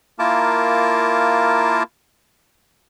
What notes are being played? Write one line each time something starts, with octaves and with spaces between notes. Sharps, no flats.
A#3 E4 F4 A#4 A5 D6